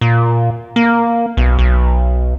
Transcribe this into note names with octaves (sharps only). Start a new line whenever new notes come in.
A#2
A#3
B1
B1